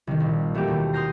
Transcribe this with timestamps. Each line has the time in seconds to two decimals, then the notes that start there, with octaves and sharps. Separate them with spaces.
0.07 C2 D#3
0.20 A#1
0.54 E3 A3 A#3 F#4 G4 A#4
0.67 D#2 B2
0.93 C6 D#6 F6 G6 A#6 C7